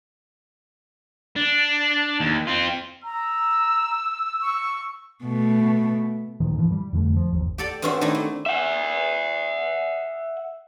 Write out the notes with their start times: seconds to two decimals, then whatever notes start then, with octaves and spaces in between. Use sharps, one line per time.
1.36 D4
2.20 D#2
2.47 C4 F4
3.04 A#5 E6
4.41 C#6
5.23 B2 A3
6.40 D2 A#2 D#3 F3
6.58 G2 E3 F3
6.72 G3
6.93 F2 D3 G#3 A3
7.17 F3
7.31 G1 D#2
7.58 G4 A4 D5
7.82 G2 C4 C#4 F#4 E5 C6
8.01 D#3 A3 D4 E4
8.15 A3
8.46 E5 F#5